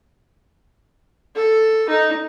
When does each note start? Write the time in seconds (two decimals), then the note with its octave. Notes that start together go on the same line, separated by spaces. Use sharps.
1.36 A4
1.89 D#4